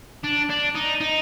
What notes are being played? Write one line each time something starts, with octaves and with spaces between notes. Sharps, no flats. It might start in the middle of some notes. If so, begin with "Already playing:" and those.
D4
D4
D#4
D#4